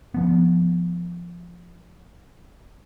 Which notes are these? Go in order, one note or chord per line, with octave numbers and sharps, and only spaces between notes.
F3 B3